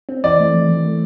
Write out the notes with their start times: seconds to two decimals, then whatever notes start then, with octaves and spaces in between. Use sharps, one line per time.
0.09 C4
0.24 E3 D5
0.39 A3
0.54 E3
0.69 E3
0.85 A3